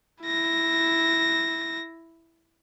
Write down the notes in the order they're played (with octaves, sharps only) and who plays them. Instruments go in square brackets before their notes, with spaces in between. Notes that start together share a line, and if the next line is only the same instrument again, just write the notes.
[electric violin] E4 A#6